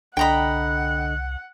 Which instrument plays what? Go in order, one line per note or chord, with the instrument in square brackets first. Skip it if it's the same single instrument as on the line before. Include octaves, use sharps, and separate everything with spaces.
[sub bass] C2 [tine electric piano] D3 D#5 [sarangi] F#5 [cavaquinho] G5 A#5 B5